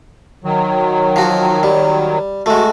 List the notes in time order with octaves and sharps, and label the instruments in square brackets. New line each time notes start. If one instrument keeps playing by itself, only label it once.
[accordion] D#3 F#3
[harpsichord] F3 F#4
G3
[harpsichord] G#3 A3 [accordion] F#4